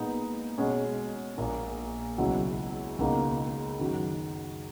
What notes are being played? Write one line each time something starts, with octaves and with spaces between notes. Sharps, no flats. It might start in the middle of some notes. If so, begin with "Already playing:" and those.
Already playing: A#2 G#3 B3 D#4
B2 G#3 C#4
A#1 A#2 A#3
C#2 B2 F#3 C#4 E4
C#2 B2 A#3 D#4
F#2 D#3 F#3